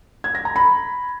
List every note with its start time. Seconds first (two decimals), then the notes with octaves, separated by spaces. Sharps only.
0.24 G#6
0.35 A#6
0.45 A#5
0.56 B5